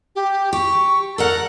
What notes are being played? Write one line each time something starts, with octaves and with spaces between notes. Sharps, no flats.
G4
G4 C#6
A4 A#4 D5 F#5